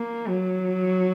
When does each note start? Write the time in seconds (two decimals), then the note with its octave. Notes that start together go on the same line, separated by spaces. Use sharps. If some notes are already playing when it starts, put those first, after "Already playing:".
Already playing: A#3
0.28 F#3